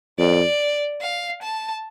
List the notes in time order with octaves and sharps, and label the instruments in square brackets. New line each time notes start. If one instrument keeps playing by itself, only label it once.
[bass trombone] F2 [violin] D5
[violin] F5
A5